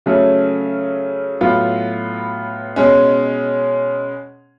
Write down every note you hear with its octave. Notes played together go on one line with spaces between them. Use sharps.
C#3 F#3 A3 C#4
A2 F#3 B3 F4
B2 G#3 C#4